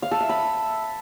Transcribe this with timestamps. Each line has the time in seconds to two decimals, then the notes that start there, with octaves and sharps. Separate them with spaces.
0.02 F5
0.11 A4
0.20 E5
0.29 B5